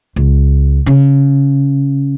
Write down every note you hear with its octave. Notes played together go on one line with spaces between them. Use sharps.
C#2
C#3